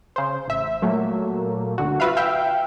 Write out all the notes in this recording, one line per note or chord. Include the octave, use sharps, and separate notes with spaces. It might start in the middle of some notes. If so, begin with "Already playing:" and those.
C#3 C5
A1 E5
A#2 F#3 A3 A#3
C#2 D3 F#4
F4 F#4 B4 E5 F5
E5 F5 G5